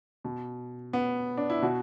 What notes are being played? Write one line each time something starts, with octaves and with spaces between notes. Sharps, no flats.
B2
B3
D4
E4
B2 F#4